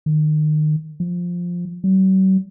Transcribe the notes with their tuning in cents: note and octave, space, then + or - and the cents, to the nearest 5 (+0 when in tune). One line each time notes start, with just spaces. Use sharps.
D#3 -30
F3 +5
F#3 +45